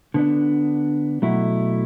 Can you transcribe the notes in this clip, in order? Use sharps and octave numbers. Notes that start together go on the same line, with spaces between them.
D3 B3 D4
B2 F#3 A3 E4